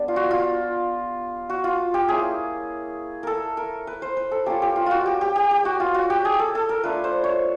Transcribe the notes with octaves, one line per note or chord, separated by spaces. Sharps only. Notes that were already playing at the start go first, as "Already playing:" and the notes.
Already playing: G3 B3 D4
F4
F#4
F4
F#4
F4
G4
A#3 C#4 E4 G#4
A4 A#4
A#4
B4
C5
B4
A4
A#3 C#4 F4 G4
G4
F4
F4 F#4
G4
G4
G4
G4
F#4
F4
F#4
G4
G#4
A4
A4
A#4
A3 D4 F4 B4
C5
C#5